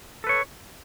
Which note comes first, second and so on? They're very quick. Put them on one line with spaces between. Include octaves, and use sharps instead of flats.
A4 B4 C#5